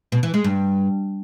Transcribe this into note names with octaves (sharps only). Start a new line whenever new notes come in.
B2
E3
G#3
G2